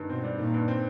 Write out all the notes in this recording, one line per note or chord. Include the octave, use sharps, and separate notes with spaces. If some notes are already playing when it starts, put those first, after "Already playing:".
Already playing: G2 D#3
B2 C4
G3
A#2 D#3
G2
C4